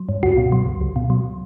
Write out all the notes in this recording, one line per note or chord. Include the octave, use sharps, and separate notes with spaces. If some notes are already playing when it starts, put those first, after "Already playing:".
Already playing: F#3
G2
C#2 F#4
B2
F#3
C#2
C#2
B2
F#3